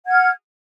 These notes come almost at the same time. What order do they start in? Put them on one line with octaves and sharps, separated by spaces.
F#5 G#6 F6